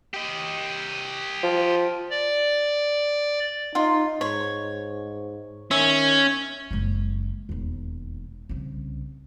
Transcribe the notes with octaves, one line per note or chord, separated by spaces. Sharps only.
G4 D#5
F3
D5
D#4 F4
G#2 C#5
D#3 C#4 E5
F#1 G#3
E1 D#2
C2 C#3